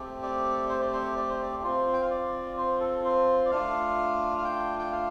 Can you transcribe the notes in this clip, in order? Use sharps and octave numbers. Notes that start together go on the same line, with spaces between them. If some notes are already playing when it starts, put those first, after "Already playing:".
Already playing: A3 C4 G4
D5
C5
D5
C5
D5
C5
D5
C4 F4 C5
G5
F5
D5
C5
A4
C5
D5
A3 D4 F4 F5
F5
G5
G5
F5